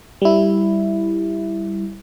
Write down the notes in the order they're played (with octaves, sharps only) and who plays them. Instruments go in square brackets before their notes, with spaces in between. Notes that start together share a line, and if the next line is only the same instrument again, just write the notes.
[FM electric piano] G3 E4